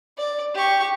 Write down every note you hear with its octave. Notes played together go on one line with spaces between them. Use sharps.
D5
G4 C#6